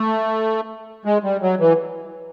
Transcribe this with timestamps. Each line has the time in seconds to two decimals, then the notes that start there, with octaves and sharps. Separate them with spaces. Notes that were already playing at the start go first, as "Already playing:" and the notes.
Already playing: A3
1.05 G#3
1.24 G3
1.42 F#3
1.60 E3